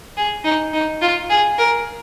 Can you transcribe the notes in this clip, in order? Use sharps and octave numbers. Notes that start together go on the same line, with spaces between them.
G#4
D#4
D#4
F4
G#4
A#4